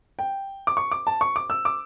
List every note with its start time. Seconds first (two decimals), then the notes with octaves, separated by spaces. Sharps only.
0.19 G5
0.67 D6
0.77 C#6
0.91 D6
1.07 A5
1.21 C#6
1.36 D6
1.50 E6
1.65 D6